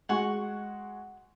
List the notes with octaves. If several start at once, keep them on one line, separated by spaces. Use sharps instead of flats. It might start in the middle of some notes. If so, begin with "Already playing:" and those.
G#3 F#4 F#5 G#5 C#6